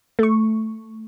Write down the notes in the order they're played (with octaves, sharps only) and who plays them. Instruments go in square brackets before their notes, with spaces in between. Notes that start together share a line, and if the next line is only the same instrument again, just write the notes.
[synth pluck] A3 C#6